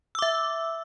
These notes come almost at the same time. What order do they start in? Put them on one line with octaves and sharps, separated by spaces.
E6 D6 E5